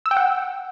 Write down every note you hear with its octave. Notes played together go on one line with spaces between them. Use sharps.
E6
G5
F#5